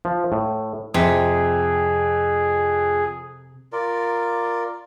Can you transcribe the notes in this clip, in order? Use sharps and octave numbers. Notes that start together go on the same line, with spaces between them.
F3
A2
F2 C3 G#4
F4 A#4 D5